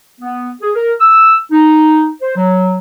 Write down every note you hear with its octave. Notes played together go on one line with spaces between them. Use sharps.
B3
G#4
A#4
E6
D#4
C5
F#3